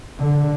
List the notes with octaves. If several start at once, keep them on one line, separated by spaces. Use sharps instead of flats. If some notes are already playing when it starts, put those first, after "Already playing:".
D3